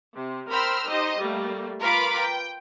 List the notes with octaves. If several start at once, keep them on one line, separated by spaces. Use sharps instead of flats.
C3
A#4 C5 G5 B5 E6 F6
D#4 G4 C5 D#5
G3 A3 A#3
F4 A#4 B4 F5 B5 D6
G5